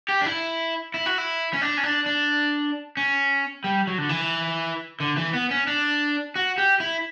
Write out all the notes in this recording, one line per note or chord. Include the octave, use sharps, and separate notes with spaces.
G4
D4
E4
E4
F#4
E4
C#4
D4
C#4
D4
D4
C#4
G3
F#3
D3
E3
D3
E3
B3
C#4
D4
F#4
G4
E4